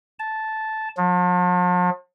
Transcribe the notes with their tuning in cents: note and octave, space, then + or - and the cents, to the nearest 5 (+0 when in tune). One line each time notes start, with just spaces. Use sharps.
A5 -10
F3 +45